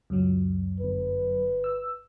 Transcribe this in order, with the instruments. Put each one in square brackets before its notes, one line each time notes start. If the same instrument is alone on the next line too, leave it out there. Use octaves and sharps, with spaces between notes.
[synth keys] C#2 [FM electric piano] F#2 F#3
[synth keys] G1 [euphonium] B4
[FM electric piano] E6